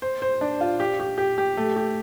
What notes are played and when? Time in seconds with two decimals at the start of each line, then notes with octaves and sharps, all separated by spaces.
0.02 C5
0.22 C5
0.41 D4
0.61 F4
0.80 G4
1.00 G4
1.18 G4
1.38 G4
1.57 A3
1.76 G4